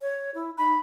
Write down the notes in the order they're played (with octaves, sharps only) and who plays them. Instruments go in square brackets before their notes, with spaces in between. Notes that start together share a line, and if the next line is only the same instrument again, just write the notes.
[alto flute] C#5
E4
[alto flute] D#4 [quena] B5